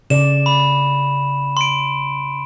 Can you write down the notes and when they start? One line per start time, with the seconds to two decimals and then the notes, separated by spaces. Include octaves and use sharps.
0.10 C#3 D5 E7
0.46 B5
1.57 C6 D7